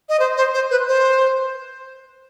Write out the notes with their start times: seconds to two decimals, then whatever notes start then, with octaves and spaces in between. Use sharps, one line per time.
0.09 D#5
0.19 C5
0.37 C5
0.54 C5
0.71 B4
0.88 C5